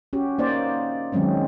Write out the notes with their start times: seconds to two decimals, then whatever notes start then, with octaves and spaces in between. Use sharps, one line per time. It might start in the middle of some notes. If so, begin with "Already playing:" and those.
0.13 C#4 F#4 G4
0.38 A#3 D#4 C5 D5
1.12 D#3 F#3 G#3 C4 C#4